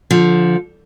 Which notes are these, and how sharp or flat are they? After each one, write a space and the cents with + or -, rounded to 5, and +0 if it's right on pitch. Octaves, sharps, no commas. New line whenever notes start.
D3 -15 F3 +0